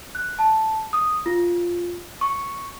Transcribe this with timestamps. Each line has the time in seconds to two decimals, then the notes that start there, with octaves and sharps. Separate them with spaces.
0.15 F#6
0.39 A5
0.93 D#6
1.26 F4
2.21 C#6